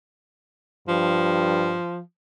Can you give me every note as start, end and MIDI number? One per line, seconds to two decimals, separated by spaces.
0.88 1.78 43
0.88 2.00 53